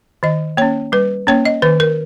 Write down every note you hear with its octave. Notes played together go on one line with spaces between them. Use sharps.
D#3 D#5
A#3 C#4 C#5
G3 B4
A#3 C#4 C#5
D#5
D#3 B4
A#4